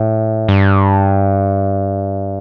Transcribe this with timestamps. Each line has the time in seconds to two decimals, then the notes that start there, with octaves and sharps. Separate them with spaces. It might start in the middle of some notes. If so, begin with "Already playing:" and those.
Already playing: A2
0.48 G2